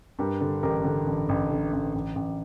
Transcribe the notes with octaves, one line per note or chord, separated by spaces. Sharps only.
G2 G4 A#4
D3
A1 G4 A#4
D3
A1
A1
D3
A1
A1
A1